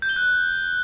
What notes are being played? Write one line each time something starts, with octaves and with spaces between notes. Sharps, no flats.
G6
G7
F#6